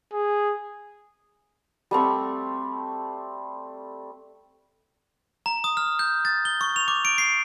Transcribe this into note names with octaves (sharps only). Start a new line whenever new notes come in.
G#4
G3 A3 C4 C#6
A#5
D#6
F6
G6
A6
G7
C#6
F7
D6
D7
C7